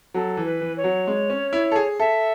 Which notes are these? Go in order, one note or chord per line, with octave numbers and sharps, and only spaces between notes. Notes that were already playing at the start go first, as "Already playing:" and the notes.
F#3 A4
E3
B4
E3
C#5
F#3
G#3
C#4
E4
A4
G#4
A4 E5